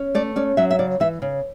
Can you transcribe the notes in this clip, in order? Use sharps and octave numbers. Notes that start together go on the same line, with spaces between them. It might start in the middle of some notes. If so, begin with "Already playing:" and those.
Already playing: C#4
A3 D5
C#4 D5
F#3 E5
E5
C#3 D5
E3 E5
C#3